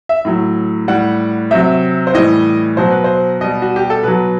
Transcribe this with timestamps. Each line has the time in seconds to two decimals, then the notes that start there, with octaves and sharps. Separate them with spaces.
0.09 E5
0.25 A2 F#3
0.88 A2 G3 F#5
1.51 C3 F#3 E5
2.07 C5
2.14 A2 E3 G3 D#5
2.77 B2 F#3 C5
2.91 B4
3.04 C5
3.40 B2 G3 D#5
3.62 F#4
3.76 G4
3.90 A4
4.03 B2 F#3 B4